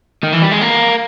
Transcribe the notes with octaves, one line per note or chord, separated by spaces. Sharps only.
D#3
E3
G3
G#3
A#3